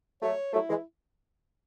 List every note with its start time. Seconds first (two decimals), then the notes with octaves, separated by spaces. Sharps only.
0.22 F#3 A3 C#5
0.53 F#3 A3 E4
0.70 E3 G#3